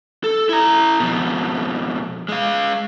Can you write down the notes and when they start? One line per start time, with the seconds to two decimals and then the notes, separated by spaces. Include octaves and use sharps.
0.24 A4
0.49 E4 A#5
1.00 F2 B2
2.29 G#3 F5